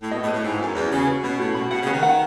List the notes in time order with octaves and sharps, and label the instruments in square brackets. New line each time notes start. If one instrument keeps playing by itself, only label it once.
[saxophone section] A2
[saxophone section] B2 [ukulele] D#5
[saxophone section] A2
[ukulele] B4
[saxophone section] A2
[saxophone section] G#2 [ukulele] E4
[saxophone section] F#2 [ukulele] G#5
[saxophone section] E2 [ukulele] C#4
[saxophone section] C#3 [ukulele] F#4
[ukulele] B4
[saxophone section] B2 [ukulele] C#4
[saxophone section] A2 [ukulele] F#4
[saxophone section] B2 [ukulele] B5
[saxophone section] B2 [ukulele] F#5
[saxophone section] C#3
[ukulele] B4
[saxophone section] D#3
[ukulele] F#5